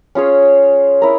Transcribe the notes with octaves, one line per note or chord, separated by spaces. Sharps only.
C#4 F4 G#4 C#5
E4 A#4